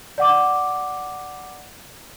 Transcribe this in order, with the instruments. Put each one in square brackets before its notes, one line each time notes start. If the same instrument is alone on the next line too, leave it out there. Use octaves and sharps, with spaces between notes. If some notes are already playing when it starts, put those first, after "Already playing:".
[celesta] D5 F#5 D6